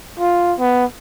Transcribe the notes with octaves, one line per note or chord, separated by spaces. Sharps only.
F4
B3